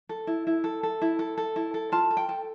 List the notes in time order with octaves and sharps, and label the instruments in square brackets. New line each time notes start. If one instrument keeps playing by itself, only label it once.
[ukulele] A4
E4
E4
A4
A4
E4
A4
A4
E4
A4
F4 A5
A4
G5
A4